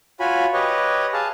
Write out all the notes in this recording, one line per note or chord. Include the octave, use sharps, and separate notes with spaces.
F4 F#4 C#5 G#5 B5
G4 B4 C#5 D#5
G#4 F5 A5